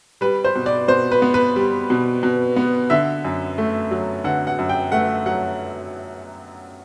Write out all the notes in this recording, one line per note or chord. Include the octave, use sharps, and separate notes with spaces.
G3 B4
C5
B2
D5
B2 C5
B4
B3
B4
G3
B2
B2
B3
D3 E5
F#2
A3
F#3
D3 F#5
F#5
F#2
G5
A3 F#5
F#3 F#5